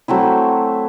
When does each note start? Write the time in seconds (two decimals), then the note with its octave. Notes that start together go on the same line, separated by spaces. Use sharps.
0.08 F#3 A3 C4 E4